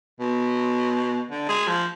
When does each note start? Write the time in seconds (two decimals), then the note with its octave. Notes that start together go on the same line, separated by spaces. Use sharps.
0.20 B2
1.31 D3
1.49 G#3
1.67 F3